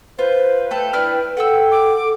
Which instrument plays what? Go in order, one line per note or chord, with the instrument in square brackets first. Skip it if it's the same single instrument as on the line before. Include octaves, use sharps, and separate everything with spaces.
[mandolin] F4 [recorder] B4 [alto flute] C5
[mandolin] A3 A4 [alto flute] G5
[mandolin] D4 E4 F6
[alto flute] A4 [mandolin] F#5 G5 E6
[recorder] D6